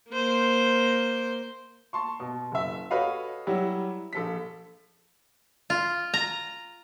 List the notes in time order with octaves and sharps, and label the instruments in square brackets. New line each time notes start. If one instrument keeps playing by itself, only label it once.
[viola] A#3 C5
[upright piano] A5 C6 C#6
B2
F#1 E5
F#4 A4 B4 C#5 D#5 F5
F#3 G3 E4 F#4 G4
A#1 A4 B6
[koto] F4
A#5